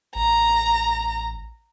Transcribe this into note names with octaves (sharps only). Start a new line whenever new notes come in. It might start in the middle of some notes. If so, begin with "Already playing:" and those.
A1 A#5